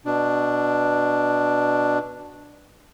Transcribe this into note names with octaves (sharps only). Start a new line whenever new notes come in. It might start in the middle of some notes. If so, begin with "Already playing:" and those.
B2 D4